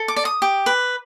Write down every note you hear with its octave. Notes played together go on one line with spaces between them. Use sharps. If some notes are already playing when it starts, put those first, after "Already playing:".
Already playing: A4
D6
D5
D#6
G4
B4